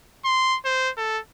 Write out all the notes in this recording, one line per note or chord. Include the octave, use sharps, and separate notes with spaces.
C6
C5
A4